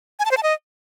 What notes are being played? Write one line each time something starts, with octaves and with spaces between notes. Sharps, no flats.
G#5
A5
C5
A5
D#5